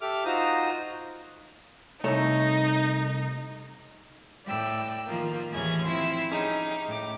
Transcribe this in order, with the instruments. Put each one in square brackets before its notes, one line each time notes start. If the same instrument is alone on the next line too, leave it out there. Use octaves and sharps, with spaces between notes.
[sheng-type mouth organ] G4 A4 E5 D6 F6
D#4 F4 F#4 C5 A#5 D#6
[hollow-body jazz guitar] C2 A3 C#5 [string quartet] D#4
[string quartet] A2 D5 G5 E6
D#3 F3 A#3
D#2 A2 E3 C#4 G#4 G#6
F3 C4 E4 C6
C#4 D#4 G4 G#4
A2 D6